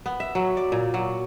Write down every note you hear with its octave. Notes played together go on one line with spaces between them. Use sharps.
B3
E5
F#3
D5
A#2
F#3